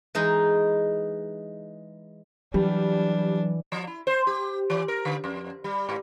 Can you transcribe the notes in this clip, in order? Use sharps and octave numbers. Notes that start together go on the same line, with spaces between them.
E3 G#3 D#4
E3 F#3 G3 D4
F3
E4
C5
G4
E3
A#4
D3
F2
G3
G#2